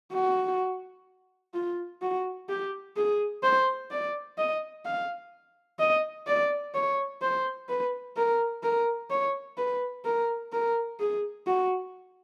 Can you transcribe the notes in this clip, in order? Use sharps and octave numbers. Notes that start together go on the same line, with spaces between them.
F#4
F4
F#4
G4
G#4
C5
D5
D#5
F5
D#5
D5
C#5
C5
B4
A#4
A#4
C#5
B4
A#4
A#4
G#4
F#4